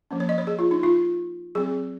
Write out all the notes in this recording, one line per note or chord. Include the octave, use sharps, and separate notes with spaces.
F3 A#3 C#4
C#5
D#5
C#5
G#4
F4
D#4
F4
F#3 C4 G#4